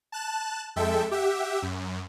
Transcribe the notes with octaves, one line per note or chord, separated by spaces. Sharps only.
A5 F#6 E7
F2 G#3 A4 E5 G5
G4 E5 F#5
F#2